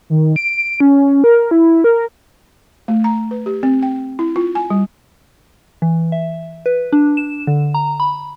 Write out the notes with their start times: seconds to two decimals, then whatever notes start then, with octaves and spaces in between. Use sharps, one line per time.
0.10 D#3
0.36 D7
0.80 C#4
1.24 A#4
1.51 E4
1.84 A#4
2.88 A3
3.04 A#5
3.31 B4
3.46 G4
3.63 C4
3.82 G5
4.19 E4
4.36 F4
4.55 G#5
4.70 G3
5.82 E3
6.12 E5
6.66 B4
6.93 D4
7.17 E7
7.47 D3
7.74 A#5
8.00 B5